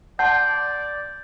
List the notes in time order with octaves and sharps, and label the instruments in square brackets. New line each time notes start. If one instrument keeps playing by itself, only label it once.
[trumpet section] D5 [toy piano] F#5 A5 C6 [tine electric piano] G6